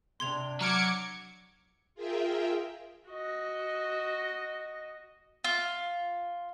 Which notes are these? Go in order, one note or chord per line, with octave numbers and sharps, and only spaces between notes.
C3 D4 C6 G#6 F7
F#3 A#5 D6 F6 G#6 C#7 D7
F4 G#4 A#4 E5 G5
F#4 D#5
F4